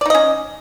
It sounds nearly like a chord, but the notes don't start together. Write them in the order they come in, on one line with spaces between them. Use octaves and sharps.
D5 D#4 D#5 C#4